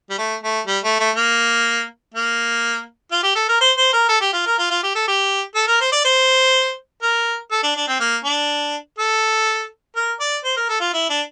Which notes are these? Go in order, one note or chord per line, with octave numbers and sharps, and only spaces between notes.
G3
A3
A3
G3
A3
A3
A#3
A#3
F4
G4
A4
A#4
C5
C5
A#4
A4
G4
F4
A#4
F4
F4
G4
A4
G4
A4
A#4
C5
D5
C5
A#4
A4
D4
D4
C4
A#3
D4
A4
A#4
D5
C5
A#4
A4
F4
E4
D4